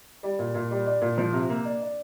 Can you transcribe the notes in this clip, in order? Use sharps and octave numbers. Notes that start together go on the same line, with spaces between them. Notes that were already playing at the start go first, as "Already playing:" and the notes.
G3
A#2
A#2
G3
D4
A#2
F3
C3
A#3
D4
D4